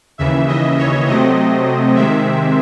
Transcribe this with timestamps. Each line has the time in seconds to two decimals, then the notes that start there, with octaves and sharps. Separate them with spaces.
0.18 D#2 C#3 E3 E5
0.48 D#5
0.78 C#5
1.06 C3 F#3 A3 C4 D#5
1.96 C3 D#3 G#3 C4 E5